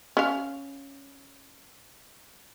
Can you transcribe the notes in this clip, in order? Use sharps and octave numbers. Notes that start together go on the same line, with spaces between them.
C#4 F5